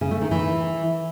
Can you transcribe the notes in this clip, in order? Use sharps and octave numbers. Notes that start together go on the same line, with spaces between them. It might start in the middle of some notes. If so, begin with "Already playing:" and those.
C#3
A3
D#3
E3